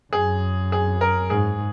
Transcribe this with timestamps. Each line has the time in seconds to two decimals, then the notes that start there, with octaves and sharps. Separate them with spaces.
0.12 F#2 G#4
0.72 G#4
1.01 A#4
1.30 G#2 G#4